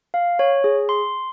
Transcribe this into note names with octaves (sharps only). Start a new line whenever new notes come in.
F5
C#5
G#4
C6